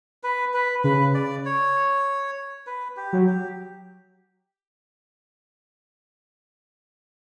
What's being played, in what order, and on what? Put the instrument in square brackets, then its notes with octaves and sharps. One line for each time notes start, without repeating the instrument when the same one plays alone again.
[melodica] B4
B4
[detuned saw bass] C#3 [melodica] B4
[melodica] D5
C#5
B4
G4
[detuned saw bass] F#3
[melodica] G4